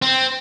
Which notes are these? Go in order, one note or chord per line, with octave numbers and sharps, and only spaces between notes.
C4